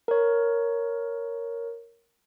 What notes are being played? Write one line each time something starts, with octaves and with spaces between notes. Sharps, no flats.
A#4 C#5